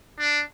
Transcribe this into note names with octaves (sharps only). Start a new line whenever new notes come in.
D4